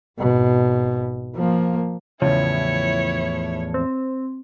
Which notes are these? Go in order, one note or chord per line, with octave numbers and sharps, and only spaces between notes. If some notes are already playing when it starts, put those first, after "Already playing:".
G#1 B2
F3 A#3
E2 A2 C#3 F3 E4 C#5
C4